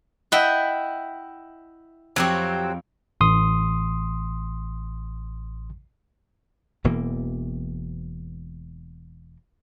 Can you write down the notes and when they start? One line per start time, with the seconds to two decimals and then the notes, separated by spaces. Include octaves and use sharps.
0.32 E4 D#5 E5 F#5 G5
2.16 F2 F#3 C4 G4 C#5
3.21 A1 C6 D#6
6.84 E1 B2 E3 A#3